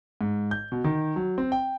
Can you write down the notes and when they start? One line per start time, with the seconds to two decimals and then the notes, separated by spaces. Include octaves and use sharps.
0.21 G#2
0.51 G6
0.72 B2
0.84 D#3
1.16 F#3
1.38 C4
1.52 G5